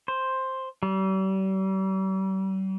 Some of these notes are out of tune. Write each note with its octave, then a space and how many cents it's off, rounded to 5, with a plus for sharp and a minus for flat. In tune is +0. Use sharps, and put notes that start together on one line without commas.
C5 +5
G3 -40